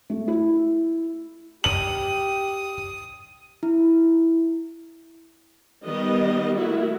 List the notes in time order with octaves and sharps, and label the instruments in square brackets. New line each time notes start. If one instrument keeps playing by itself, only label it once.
[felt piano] A3
E4
[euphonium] G4 [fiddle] D#6 [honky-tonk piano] F#7
[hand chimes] E4
[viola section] D#3 G3 B3 D#5
A3 A#3 E4 F#4